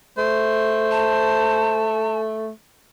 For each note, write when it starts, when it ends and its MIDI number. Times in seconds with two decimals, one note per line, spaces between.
0.18 2.49 57
0.18 1.93 72
0.91 2.20 81